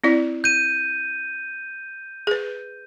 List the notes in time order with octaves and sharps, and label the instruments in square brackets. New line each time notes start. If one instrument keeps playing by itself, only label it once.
[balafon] C4 E4 D5
[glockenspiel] G6 D#7
[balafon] G#4 B4